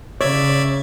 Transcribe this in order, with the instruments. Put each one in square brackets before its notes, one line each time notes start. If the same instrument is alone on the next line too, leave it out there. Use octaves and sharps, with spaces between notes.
[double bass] C#3 [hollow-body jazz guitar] C#5 [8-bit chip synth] D5 E5 G#6